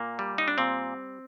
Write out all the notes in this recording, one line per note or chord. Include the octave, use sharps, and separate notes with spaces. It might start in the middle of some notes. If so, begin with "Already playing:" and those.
Already playing: A#2 A#3
G3
D#4
D4
A#2 C4